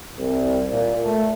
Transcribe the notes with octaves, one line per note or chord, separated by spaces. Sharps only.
C2
A#2
A3